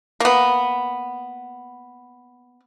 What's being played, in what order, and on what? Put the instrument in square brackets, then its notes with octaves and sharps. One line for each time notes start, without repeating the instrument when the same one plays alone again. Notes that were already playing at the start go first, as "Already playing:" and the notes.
[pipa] A#3 B3